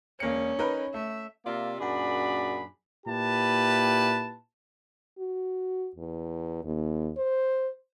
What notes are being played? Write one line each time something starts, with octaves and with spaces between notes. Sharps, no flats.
E1 A#3 C#4 C#7
D#4 A#4 B4
A3 E5
C3 A#3 F4 D5 E5 F5
F#2 A#2 D4 G#4 D5 B5
A#2 E4 G4 B4 A5
F#4
E2
D#2
C5